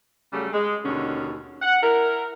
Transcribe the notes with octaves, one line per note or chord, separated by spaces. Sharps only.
C#3 F#3 G3 A3
G#3
D#2 B2 D3 D#3 C#4
F#5
E4 A#4